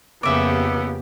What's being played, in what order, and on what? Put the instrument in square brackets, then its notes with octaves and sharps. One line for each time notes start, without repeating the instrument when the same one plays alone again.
[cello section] F2 G4 [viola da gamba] C#3 A#3 [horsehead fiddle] B3 [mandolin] E5 D6